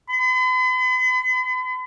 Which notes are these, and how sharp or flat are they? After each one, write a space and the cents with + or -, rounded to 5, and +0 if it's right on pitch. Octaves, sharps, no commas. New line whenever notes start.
B5 +45